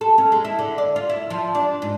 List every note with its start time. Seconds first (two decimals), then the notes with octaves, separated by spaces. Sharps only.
0.01 A4
0.18 C#4
0.32 G#3
0.45 E4
0.59 D3
0.78 D5
0.96 F4
1.10 E4
1.30 F3
1.55 D4
1.82 G#2